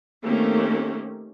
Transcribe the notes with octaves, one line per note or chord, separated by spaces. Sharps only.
D#3 A3 A#3 C4 C#4 G4